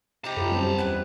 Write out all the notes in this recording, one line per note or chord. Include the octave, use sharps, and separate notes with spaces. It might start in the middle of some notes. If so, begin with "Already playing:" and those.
C3 D#4 G4 A5 A#5
F#2 F4 A4
G3 C4 C#4
E2 E4 B4 F#5